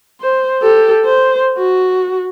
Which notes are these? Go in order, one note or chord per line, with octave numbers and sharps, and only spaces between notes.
C5
G4 A4
C5
F#4